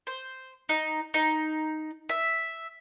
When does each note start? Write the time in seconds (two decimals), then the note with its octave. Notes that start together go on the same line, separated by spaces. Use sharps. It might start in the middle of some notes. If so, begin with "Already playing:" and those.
0.07 C5
0.69 D#4
1.14 D#4
2.09 E5